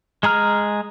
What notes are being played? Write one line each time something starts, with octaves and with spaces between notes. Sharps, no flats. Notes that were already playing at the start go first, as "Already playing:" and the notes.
G#3 G#4 A#5 F6